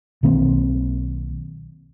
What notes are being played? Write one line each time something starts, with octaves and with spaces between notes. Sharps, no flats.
B1 D#3 A#3 C4